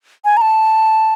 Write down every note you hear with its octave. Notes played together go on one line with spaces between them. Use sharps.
G#5
A#5
A5